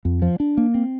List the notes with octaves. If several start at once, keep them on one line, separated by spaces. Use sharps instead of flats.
F2
F3
D4
A#3
C4